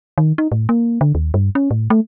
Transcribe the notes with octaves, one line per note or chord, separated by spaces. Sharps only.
D#3
D#4
A2
A#3
D3
D#2
G2
C#4
A2
A3